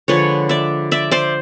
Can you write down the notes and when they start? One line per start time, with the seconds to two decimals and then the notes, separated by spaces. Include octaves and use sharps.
0.08 D3 F3 G#3 B4 C#5
0.49 D5 E5
0.91 D5 E5
1.11 C5 D5